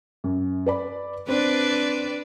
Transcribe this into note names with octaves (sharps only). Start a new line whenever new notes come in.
F#2
B4 D5 B5
C4 D4 B4 D5